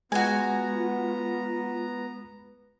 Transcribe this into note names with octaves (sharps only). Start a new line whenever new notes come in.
G#3 B3 F4 F#4 G#5 A#5